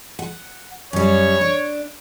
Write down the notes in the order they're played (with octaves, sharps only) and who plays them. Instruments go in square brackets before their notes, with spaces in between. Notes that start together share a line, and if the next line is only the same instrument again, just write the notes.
[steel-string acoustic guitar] F#5
[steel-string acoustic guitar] F#2 G3 [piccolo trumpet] C#5
[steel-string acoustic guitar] D4